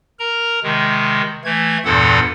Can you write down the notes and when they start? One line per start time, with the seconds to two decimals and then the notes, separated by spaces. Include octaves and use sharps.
0.20 A#4 A#5
0.63 C3 D#3 G#3
1.45 E3 A3 G#6
1.85 E2 G2 A#2 E3 A4 F#5